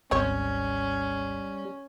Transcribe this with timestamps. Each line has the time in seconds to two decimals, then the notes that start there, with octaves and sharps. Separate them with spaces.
0.11 G#1 D2 G#2 G3 C4 C#4 C#5